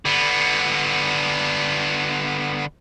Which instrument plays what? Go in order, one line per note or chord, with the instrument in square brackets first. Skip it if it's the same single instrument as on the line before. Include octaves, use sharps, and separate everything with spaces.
[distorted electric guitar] D3 B3